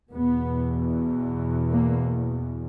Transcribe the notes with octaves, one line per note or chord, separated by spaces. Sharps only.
E2 B2 B3
A#3